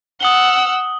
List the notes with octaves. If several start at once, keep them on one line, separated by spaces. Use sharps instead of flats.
F#5 D#6 E6 F#7 G7